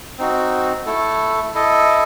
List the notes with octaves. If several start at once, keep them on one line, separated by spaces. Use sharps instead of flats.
C4 D#4 F#4
A3 E4 A4
E4 A4 D#5